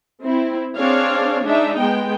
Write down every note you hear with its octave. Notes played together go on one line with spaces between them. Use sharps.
C4 E4
C4 D4 G#4 C#5 D5 F5
G#3 D4 D#4 E5
G#3 B3 G5